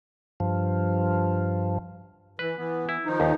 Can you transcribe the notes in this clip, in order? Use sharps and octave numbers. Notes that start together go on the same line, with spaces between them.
G2 F3
E3 B4
E3 B3
E4
D#3 F3 D#4
D#2